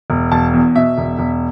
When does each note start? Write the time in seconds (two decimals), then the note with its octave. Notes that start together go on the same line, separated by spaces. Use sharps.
0.10 E1
0.32 E1 A5
0.54 E2
0.75 B2 E5
0.98 E1
1.19 E1